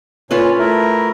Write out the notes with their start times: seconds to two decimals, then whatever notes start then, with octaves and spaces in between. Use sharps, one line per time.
0.31 A#2 C#4 F4 A4 B4 C#5
0.59 A3 E4 A#4